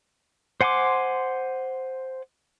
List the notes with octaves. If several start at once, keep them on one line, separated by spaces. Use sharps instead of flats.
C5 F#5 G#5 C6 D6